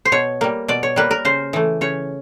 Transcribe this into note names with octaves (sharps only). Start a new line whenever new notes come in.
C5
B2 C#5
G3 A#3
B2 D5
C#5
G3 A#3 B4
A#4
C#3 C5
E3 A3
C#3 C#5